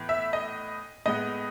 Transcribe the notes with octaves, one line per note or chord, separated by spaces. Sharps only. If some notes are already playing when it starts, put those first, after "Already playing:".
Already playing: A2 E3 B3
E5
D#5
A2 G#3 B3 D#5